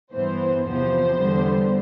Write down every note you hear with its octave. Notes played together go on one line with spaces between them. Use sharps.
G2 E3 B3 C5
E2 C3 F3 B3 C5
E2 D3 G3 B3